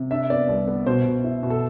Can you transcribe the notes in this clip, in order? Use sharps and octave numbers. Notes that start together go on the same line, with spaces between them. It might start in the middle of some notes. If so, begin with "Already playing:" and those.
Already playing: C3
D4 E5
B3 D5
C2
B3
B2 C5
B2
E4
B2
A4